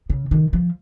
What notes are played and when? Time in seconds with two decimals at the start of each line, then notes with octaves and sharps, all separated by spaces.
0.10 C#3
0.31 D#3
0.53 F3